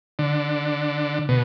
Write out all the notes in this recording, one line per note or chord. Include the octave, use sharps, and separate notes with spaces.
D3
B2